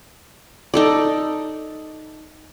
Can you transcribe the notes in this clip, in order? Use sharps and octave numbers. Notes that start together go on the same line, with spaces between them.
D#4 A4 D5